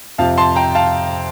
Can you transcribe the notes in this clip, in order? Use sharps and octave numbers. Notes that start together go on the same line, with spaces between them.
F2 C3 F3 F5 A5
A5 C6
G5 A#5
F5 A5